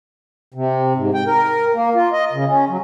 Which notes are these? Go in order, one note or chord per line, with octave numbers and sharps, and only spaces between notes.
C3
G#2
G5
A#4
A#3
F4
D#5
C#3
C#4
F#3